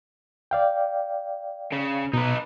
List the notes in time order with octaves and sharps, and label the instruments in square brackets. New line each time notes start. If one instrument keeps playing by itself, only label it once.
[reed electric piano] D5 F5 G5
[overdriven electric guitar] C#3
[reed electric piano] B2 [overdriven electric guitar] D#4 B4